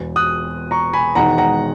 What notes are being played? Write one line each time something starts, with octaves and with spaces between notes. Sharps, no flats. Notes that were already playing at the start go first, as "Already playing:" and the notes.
Already playing: E1 E2 B2
D#6 F#6
A#5 C#6
G#5 B5
E1 E2 D#3 G#3 D#4 F#5 A#5
F#5 A#5